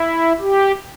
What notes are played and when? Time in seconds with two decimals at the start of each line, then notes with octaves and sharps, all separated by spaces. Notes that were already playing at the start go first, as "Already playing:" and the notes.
Already playing: E4
0.40 G4